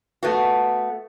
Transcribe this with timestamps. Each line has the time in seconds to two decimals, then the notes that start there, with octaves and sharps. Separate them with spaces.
0.23 A3 B3 F#4